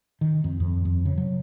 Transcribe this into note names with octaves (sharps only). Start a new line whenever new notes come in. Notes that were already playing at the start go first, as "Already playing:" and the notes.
D#3
F2
F2
F2
C#3
F#3